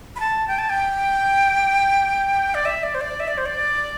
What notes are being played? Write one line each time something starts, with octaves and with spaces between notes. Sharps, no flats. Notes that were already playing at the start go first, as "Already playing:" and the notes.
B5
A5
G5
A5
G5
D5
E5
D5
C5
D5
E5
D5
C5
D5